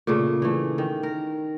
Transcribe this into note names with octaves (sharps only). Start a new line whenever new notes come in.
A#2 C#3 A3 D4
E3 A3
D#3
A#4